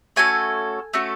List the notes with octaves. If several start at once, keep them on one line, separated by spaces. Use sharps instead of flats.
A3 C#4 F#4 A4 G#5
A3 C#4 F#4 A4